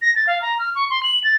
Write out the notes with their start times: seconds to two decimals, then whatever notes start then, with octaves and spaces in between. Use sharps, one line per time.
0.02 A#6
0.15 A6
0.27 F5
0.42 A#5
0.59 F6
0.75 C#6
0.90 C6
1.03 F#7
1.24 A6